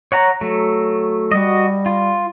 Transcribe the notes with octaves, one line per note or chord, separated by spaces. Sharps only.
C#5 F#5 A#5
F#3 A3
G3 F#4 D#5
F4